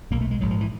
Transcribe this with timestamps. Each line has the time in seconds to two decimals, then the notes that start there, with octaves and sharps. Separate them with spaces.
0.11 B1 A#2 A#3
0.21 A3
0.31 G#3
0.41 A#1 G#2 F#3
0.51 F3
0.61 E3